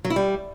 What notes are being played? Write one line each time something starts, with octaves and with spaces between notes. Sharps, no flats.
F#3
E4
G3